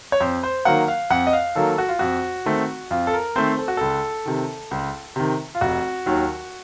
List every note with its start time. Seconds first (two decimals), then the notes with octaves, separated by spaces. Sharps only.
0.12 C#5
0.20 F2 C5
0.43 C5
0.65 D#3 F#3 A#3 F#5
0.88 F5
1.10 F2 F#5
1.27 D#5
1.33 F5
1.55 D#3 F#3 A#3 A4
1.78 F#4
1.89 F4
1.99 F2 F#4
2.46 D#3 A3 C4
2.91 F2 F4
3.07 A4
3.13 A#4
3.36 D#3 A3 C4 C5
3.59 A4
3.68 F#4
3.77 C#2 A4
4.26 C3 D#3
4.71 C#2
5.16 C3 D#3
5.55 F4
5.61 F1 F#4
6.06 D#2 D#3 F#3